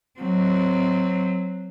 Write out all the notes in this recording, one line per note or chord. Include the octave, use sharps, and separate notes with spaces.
F#3 C4